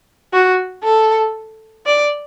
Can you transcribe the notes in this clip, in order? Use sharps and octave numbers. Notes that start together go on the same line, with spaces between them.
F#4
A4
D5